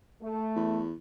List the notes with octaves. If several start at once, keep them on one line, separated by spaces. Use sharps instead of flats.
A3
E2